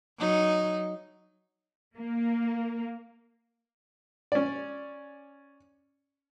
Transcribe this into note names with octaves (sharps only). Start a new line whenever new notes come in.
F#3 D#4
A#3
C#4 D5